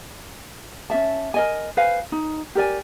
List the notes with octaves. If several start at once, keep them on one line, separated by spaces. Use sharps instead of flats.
C#4 D4 E5 A5
A#4 D#5 G#5
B4 C5 F5 G#5
D#4
G4 A#4 D5 G#5